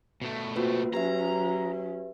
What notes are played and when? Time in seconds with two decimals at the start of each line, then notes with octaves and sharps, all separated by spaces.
0.22 B2 A3
0.56 A#3 C4 F4 F#4 B4
0.93 F#3 C#4 G4 B4 E5 A#5